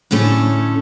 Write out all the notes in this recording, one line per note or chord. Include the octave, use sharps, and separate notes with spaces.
A2 D3 A3 C#4